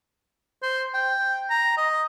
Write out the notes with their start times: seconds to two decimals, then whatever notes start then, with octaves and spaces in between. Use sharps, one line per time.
0.63 C5
0.94 G5
1.50 A#5
1.77 D#5